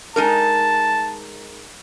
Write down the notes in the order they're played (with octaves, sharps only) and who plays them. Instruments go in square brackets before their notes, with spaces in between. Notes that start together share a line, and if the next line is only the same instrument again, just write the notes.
[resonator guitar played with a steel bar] G#3 D#4 A#4 [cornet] A5